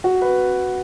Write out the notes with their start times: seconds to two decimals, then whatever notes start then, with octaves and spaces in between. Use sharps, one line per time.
0.04 F#4
0.22 B4